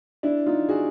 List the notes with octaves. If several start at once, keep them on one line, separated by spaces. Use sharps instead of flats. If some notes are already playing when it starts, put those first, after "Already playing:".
D4 E4
D#4 F4
F#4 G#4